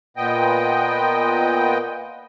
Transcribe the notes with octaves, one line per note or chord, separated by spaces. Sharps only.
A#2 B3 D#5 G5